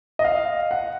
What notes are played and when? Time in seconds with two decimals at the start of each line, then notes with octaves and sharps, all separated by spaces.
0.19 D#5
0.24 F5
0.71 F#5